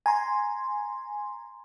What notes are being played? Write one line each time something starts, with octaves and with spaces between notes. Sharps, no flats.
G#5 A#5 C6